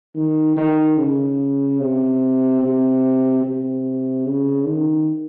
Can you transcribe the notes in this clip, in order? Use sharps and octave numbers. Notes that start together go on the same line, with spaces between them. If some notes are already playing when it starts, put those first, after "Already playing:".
D#3
D#3
C#3
C3
C3
C3
C#3
D#3